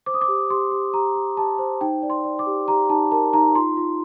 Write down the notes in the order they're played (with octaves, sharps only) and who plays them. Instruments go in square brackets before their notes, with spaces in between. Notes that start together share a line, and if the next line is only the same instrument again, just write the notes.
[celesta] C5 D6
D#6
D6
G4
G4 C6
G4
G4 A#5
G4
G4 A5
C5
D#4 G5
D5
C6
D5
D6
G4
G4 A#5
D#4 A5
A#4 A5
D#4 A#5
F4 C6
F4